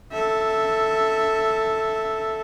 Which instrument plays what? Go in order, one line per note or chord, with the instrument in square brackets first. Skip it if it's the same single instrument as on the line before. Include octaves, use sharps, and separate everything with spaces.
[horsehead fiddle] A4 E5